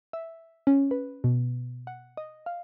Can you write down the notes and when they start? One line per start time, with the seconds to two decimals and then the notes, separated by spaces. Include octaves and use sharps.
0.13 E5
0.67 C#4
0.91 B4
1.24 B2
1.87 F#5
2.17 D#5
2.46 F5